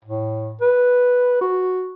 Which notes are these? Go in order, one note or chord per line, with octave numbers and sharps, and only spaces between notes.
A2
B4
F#4